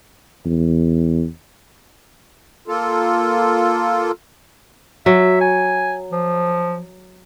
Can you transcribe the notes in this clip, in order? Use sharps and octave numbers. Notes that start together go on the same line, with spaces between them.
E2
A#3 F4 A4
F#3 E5
G#5
F3